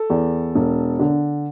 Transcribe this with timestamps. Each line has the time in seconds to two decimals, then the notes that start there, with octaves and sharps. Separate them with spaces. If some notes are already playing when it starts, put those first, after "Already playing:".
Already playing: A4
0.10 E2
0.55 E1
0.99 D3